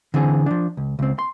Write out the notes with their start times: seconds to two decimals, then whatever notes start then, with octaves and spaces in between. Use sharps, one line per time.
0.14 D3 E3 C4 G#4
0.46 F3 D4
0.77 C#2
0.99 C#2 C4
1.19 C6